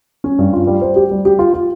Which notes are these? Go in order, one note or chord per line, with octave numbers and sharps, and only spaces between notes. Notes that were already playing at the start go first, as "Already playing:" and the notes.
C#4
G2
F4
G3
C5
G4
G3
G4
F4
F4